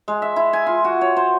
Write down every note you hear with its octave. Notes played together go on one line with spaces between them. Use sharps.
G#3
E5
E4
G#5
F4
F#4
C#5
C5